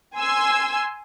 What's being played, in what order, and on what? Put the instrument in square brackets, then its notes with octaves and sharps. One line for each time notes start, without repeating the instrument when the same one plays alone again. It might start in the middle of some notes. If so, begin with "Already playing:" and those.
[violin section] G#5 C6 E6 G#6